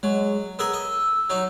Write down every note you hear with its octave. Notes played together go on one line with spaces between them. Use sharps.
F#3 G#3
B3 G#4 A#4 E6
D#5
F#3 D#4